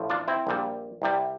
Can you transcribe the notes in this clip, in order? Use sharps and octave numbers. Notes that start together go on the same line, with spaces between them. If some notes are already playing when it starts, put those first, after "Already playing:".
Already playing: A1 A2 F3
D4 F4
C4 E4
A#1 A#2 G3
C2 C3 G3